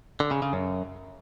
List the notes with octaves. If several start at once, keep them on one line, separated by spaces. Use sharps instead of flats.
D3
C#3
C#3
F#2